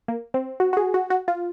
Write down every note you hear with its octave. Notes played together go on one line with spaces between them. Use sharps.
A#3
C4
F#4
F#4
G#4
F#4
F#4
F4